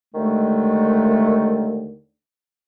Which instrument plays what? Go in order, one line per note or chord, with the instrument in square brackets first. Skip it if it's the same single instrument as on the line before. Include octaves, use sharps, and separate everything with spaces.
[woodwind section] D#2 D3 D#3 G#3 A3